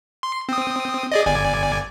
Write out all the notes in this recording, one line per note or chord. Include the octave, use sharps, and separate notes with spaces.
C6
C4 D#6
G#4 D5 D#5
G1 D5 G#5